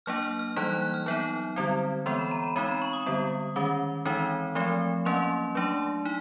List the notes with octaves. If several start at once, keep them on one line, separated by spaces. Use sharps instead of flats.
F#3 A#3 D4 F6
F6
F6
E3 G3 A#3 D#4 F#6
F#6
F#6
F6
F#3 B3 D#4
D3 G3 C4
E3 G#3 B3 C6
B5
A#5
B5
G#3 C4 D#4 A#5
B5
C#6
D#6
D3 G3 B3
D#3 G#3 C#4 D6
E3 G#3 C4 D#4
F3 A3 C4
F#3 A#3 C#4 C6
F#3 A3 D4
D#4